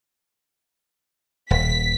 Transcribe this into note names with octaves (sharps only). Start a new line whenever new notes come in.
D#1 B6